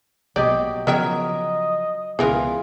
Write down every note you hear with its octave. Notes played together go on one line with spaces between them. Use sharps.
A#1 B2 F#3 G4 D5 D#5
C#3 F3 F#3 B3 A#4 D#5 E5 G5
C#2 B2 E3 F4 G#4 A#4 B4